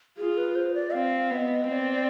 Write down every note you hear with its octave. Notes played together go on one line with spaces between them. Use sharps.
F4 G#4
B4
C5
D5
C4 F5
B3 D#5 F5
C4 D5 D#5